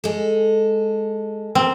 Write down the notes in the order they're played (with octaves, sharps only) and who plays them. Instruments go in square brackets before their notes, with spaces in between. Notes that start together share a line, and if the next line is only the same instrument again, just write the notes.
[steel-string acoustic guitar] G#3 A4
[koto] C4 [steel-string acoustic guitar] A#4